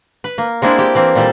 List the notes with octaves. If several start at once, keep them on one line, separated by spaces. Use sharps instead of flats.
B4
A#3
G#3 A#3 C4 D4 E4
G4
E3 A#3 C4
A#2 G3 A4